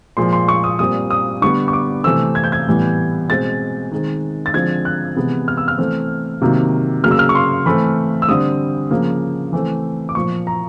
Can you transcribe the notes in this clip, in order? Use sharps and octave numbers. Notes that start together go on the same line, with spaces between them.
A#2 F3 G#3 C6
C6
C#6
D#6
A#2 G3 C4 D#6
D#6
D3 G3 B3 C#6
C#6
D6
C3 E3 A3 C4 E6
G#6
G6
G#6
A2 E3 G3 B3
B2 G#3 C4 A6
D#3 G#3 C4
A6
D3 F3 G#3 C4 G#6
F#6
C3 E3 G#3 B3
F6
E6
F6
E3 A3 C4
C3 D#3 F#3 A#3
C#3 F#3 A#3 F6
E6
F6
C#6
C6
E3 A3 C4 B5
E6
D3 G3 C4 D#6
C#3 F3 A#3
E3 A3 C4
D6
A#2 F3 A#3 C#6
A#5